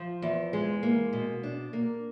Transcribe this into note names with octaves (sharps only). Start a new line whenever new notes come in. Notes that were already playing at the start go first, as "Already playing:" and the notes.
Already playing: F3
E2
G#3
A#3
B2
D4
A#3